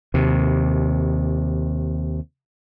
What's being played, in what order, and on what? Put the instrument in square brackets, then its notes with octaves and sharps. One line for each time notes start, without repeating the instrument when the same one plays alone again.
[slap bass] D#2 C3